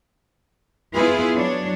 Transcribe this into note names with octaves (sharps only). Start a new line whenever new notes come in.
B3 E4 F4 G#4 B4
F#3 D4 C#5